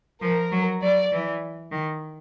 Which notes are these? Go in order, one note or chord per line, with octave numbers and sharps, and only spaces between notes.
F3 A#4
F#3
F#3 D5
E3
D#3